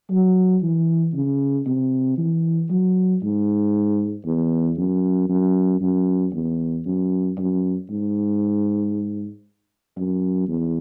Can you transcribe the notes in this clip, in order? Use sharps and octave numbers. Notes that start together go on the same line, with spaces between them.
F#3
E3
C#3
C3
E3
F#3
G#2
E2
F#2
F#2
F#2
E2
F#2
F#2
G#2
F#2
E2